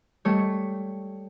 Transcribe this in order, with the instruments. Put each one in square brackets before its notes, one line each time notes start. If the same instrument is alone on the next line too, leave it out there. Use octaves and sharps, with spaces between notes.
[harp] G3 A3 C#5